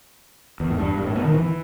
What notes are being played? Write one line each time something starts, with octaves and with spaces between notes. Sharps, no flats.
E2
A2
G2
G2
A2
B2
D#3
E3